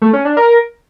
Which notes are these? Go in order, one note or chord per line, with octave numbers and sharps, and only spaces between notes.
A3
C#4
D4
A#4